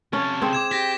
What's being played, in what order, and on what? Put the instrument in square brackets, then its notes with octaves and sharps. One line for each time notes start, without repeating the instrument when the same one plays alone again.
[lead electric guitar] C3 A4 [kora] C#4
[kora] C4 G#4
[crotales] D6 G#6 E7
[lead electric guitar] G4 [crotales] A#6 B6